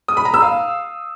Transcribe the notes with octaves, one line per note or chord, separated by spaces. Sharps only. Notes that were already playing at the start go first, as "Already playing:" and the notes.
D#6
B5
A#5
E6
F5